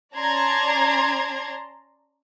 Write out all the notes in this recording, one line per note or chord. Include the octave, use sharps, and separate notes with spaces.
C#4 D5 A5 A#5 C6 G#6